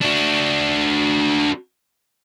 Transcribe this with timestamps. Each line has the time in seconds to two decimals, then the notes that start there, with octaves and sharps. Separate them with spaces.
0.02 D4 F#4